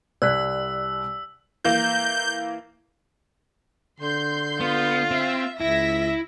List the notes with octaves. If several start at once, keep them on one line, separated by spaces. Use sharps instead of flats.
C2 D5 E6 F#6 B6
E3 A#3 G6
D3 C6 G6
B3 F4
C4 E5
C#2 E4 E5 A#6 B6